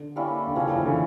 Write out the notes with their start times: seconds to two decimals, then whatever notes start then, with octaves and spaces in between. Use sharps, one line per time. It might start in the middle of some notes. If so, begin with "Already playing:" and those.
Already playing: D3
0.16 G3 A#3 C#4 E4
0.47 D3
0.55 C#3 F3 A#3 C#4
0.65 D3
0.76 E3
0.85 D3